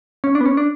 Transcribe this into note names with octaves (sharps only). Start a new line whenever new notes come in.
C#4
D4
B3
C#4
D4